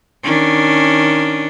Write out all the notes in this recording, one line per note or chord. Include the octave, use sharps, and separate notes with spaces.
D#3 C#4 D4